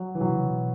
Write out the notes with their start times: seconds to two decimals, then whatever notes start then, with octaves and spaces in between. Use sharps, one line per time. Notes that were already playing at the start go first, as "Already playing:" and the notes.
Already playing: F#3
0.15 E3
0.21 B2 F#3
0.32 C#3
0.43 B2